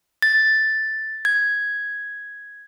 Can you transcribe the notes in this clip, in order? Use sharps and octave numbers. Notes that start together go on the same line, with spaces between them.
A6
G#6